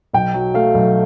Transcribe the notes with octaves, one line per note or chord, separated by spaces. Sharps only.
B1 G5
F#3
A3 F5
B1